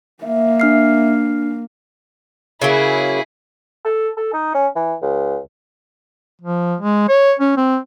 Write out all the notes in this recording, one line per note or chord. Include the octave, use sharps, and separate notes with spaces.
A#3 E5
D4 F6 C7
C#3 F#3 A#3 E4 G#4
A4
A4
D#4
C#4
E3
C#2
F3
G#3
C#5
C#4
C4